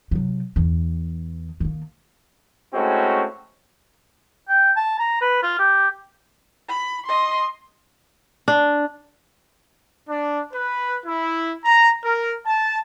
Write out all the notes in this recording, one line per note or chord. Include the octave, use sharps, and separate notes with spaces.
C3 F#3
E2 E3
D#3 A#3
G#3 A3 C4 C#4 E4 F#4
G5
A5
A#5
B4
F4
G4
B5
D#5 C6
D4
D4
B4
E4
A#5
A#4
A5